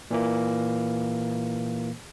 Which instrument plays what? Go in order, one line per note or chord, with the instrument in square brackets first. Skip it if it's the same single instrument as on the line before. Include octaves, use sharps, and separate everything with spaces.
[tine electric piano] A#2 E3 A#3